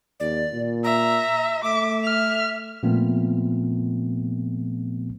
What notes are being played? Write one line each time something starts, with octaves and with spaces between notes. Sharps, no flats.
D#2 D5
A#2
E5 A#5
A3 E5 D6
F6
A#2 F3 A3 B3 C4